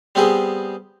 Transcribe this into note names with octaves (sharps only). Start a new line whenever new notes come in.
G3 B3 C4 G4 G#4